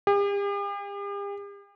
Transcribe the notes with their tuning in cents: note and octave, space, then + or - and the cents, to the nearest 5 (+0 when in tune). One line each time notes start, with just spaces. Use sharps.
G4 +45